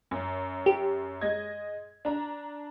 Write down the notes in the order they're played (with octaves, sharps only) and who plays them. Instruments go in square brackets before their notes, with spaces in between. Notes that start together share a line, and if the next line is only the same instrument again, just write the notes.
[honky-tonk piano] F#2
[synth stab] G4
[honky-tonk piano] G#3 D#5 G#6
D4 A#5